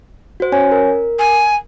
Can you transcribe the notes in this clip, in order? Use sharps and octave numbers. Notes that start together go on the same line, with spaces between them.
F#4 C5
C#4 C#5 G#5
A#4
G#5